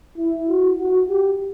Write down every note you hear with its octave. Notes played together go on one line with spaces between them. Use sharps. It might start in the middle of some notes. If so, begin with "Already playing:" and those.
E4
F#4
F#4
G4